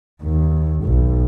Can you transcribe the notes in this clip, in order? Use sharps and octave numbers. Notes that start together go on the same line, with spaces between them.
D#2
B1